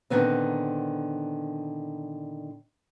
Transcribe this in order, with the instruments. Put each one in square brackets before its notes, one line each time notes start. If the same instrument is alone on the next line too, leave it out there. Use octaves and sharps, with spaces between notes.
[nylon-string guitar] A#2 D3 D#3 B3 C4